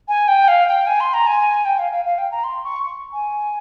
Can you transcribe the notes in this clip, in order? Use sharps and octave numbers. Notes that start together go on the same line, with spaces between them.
G#5
G5
F5
G5
G#5
C6
A#5
G#5
G5
F5
F5
F5
G5
A#5
C6
C#6
C#6
G#5